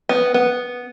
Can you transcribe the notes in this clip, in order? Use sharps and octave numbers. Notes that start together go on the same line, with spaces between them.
B3
B3